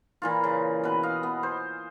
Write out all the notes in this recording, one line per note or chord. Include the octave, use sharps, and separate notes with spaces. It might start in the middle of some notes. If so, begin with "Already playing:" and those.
A#2 E3 F4
C#3
B2 B4
D#5 F5
B3
C5